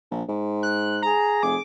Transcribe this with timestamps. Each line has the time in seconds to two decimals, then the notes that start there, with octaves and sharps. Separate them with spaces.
0.11 A#1
0.29 G#2
0.63 F#6
1.02 G#4 A#5
1.43 F1 D6